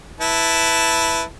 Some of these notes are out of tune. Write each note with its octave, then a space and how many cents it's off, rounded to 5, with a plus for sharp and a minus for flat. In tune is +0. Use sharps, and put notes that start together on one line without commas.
E4 +0 B4 +0 A5 +0